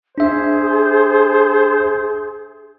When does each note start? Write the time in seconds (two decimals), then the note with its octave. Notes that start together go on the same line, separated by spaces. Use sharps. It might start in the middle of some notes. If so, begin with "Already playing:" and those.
0.18 D4 G#4 C5 E5